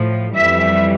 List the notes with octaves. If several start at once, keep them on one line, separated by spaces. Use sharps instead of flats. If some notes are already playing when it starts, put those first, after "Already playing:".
Already playing: A2 F3
F2 E3 G3 E5